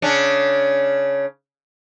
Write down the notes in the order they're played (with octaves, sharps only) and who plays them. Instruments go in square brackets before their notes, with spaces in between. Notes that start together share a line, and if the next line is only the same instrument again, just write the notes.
[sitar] C#3 C#4 D4